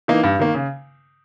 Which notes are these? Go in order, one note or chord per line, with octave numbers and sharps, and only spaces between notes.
E3 A#3 D#4
G2
D#3 A#3
C#3